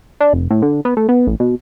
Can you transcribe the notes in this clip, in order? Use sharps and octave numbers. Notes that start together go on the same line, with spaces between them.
D4
F1
A2
D3
B3
A3
B3
A1
B2